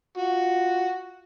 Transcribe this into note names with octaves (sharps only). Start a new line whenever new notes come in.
F4 F#4